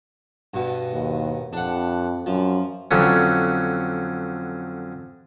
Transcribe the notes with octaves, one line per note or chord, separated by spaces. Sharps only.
G2 B2
D#2
F2 D4 F#5
F#2 F3
F2 D3 F#3 C#4